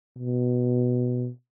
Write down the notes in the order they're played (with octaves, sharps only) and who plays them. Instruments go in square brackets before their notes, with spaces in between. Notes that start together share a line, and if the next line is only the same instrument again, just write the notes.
[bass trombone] B2